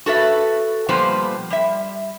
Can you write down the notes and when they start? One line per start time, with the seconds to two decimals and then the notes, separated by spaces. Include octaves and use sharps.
0.06 F#4 A4 B4 E5
0.89 A#2 F3 G3 B3 B4 C5
1.50 G3 E5